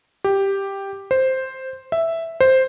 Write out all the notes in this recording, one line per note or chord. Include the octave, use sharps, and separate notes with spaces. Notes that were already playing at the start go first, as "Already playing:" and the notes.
G4
C5
E5
C5